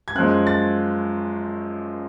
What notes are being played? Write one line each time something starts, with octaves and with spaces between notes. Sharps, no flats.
G#6
F#2 F3 G#3 F#6
A6